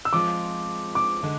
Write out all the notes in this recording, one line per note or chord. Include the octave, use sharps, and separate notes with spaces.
E6
F3 G#3 C4 F4 D6
D6
D3 G#3